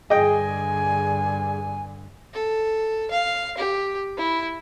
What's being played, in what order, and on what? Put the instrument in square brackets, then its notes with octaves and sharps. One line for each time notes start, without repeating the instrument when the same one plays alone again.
[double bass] G2 D3 [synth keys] G#4 [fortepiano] D#5 G5 [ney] G#5
[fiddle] A4
F5
G4
E4